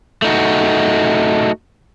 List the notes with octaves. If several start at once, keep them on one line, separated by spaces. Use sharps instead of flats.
A3 D#4 F#4